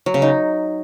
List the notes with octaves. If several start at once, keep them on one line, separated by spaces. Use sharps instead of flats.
F#3
C#3
D#4